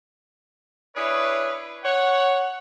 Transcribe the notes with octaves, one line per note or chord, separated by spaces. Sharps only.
D4 E4 G#4 B4 C#5
C#5 F#5